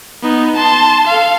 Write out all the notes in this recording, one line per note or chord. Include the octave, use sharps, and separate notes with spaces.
B3 D#4
A5 C6
A4 F5